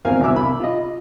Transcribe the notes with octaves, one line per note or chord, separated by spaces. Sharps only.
G#1 E2 C4 A#4 F5 G#5
C2 B2 D6 E6
B5
F4 D#5